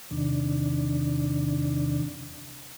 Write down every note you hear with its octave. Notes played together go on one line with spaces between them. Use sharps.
E2 C3 D#3 D4